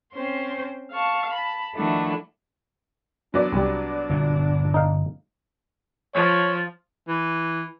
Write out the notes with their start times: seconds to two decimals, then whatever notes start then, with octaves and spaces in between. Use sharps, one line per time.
0.14 C4 C#4 C5 C6
0.91 F5 A5 C#6
1.32 A5 B5
1.74 D#3 F3 A3 D4 E4 F#4
3.34 F#3 B3 D4 D5
3.52 C2 G3
4.09 G1 G2 A#2
4.74 D#4 F5
6.15 F3 C#5
7.08 E3